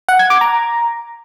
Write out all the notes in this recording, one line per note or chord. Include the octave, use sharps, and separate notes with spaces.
F#5
G#6
D6
A#5